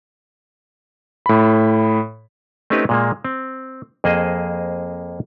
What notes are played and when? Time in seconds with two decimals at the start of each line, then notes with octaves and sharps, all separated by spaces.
1.26 A2 B5
2.70 A3 C4 C#4 D#4 G4 B4
2.89 A#2 G#3 A#3
3.24 C4
4.04 F2 A#3 G#4 C5 D#5